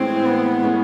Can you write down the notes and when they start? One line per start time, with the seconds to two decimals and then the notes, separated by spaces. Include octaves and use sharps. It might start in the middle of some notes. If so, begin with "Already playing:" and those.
Already playing: A2 E3 G#3 C4 C#4
0.25 B3
0.62 A2 E3 G#3 C#4